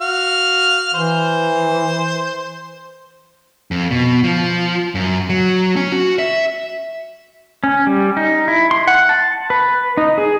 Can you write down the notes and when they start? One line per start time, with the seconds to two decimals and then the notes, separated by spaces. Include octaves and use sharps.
0.01 F#4 F5
0.94 E3 C5
3.71 F2
3.91 B2
4.24 F3
4.95 F#2
5.30 F#3
5.76 C#4
5.92 F#4
6.19 E5
7.64 C#4
7.87 G3
8.17 D#4
8.48 E4
8.71 C6
8.87 F#5
9.09 A5
9.50 B4
9.97 D#4
10.18 G#4